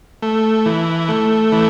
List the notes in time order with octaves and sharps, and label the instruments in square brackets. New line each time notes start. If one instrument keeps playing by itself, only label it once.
[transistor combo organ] A3
E3
A3
E3